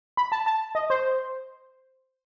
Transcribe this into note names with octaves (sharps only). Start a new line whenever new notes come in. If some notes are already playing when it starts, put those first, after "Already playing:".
B5
A5
A5
D#5
C5